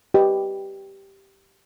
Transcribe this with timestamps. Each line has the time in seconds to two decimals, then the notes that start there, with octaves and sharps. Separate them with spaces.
0.14 G4 B4 D#5